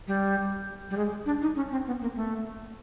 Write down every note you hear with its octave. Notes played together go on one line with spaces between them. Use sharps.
G3
G3
G#3
D4
D#4
C#4
C4
B3
A#3
A3